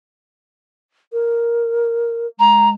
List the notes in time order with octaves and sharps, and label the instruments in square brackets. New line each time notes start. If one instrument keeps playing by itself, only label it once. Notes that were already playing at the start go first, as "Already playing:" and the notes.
[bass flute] A#4
[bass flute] G#3 [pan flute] A#5